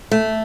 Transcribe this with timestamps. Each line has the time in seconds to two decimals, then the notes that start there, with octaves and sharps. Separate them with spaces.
0.11 A3